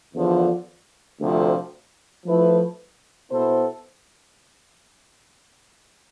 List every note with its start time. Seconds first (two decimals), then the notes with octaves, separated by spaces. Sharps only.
0.14 E2 D3 F3
1.20 D2 C3 F3
2.26 F3 A3 E4 B4
3.32 B2 B3 E4 A4 C5